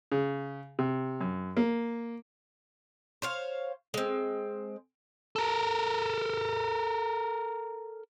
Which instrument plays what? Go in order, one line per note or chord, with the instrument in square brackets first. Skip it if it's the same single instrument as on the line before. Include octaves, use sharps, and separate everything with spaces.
[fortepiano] C#3
C3
F#2
A#3
[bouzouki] C5 C#5 F5
G#3 C4
[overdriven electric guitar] A4 A#4